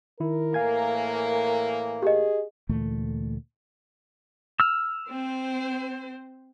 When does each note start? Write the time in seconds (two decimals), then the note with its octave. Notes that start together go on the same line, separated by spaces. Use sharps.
0.20 D#3 E4 A#4
0.54 A2 E3 A#3 F5 G#5 G#6
2.03 G4 G#4 D#5
2.69 D2 A#2 E3 A3
4.60 E6 F6
5.09 C4 C5